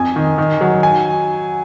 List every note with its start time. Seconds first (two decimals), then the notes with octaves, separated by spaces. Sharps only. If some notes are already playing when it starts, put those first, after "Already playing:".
Already playing: F2 G#5
0.16 D#3
0.38 D#3
0.61 F#3
0.83 G#5